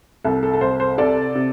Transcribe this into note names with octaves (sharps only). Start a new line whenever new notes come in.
C2 A4
A4
A4
C2 C5
C5
C3 A4 D5
C3